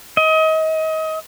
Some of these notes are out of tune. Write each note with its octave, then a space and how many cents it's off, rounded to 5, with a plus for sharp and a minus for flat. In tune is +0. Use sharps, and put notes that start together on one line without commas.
D#5 +30